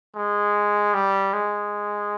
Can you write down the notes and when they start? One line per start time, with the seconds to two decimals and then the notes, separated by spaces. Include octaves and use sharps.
0.16 G#3
0.94 G3
1.33 G#3